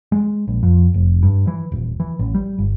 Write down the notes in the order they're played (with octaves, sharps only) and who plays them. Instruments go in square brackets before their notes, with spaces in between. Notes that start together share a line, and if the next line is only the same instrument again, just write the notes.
[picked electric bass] G#3
A#1
F2
F1
G2
E3
D#1
E3
A1
G3
G1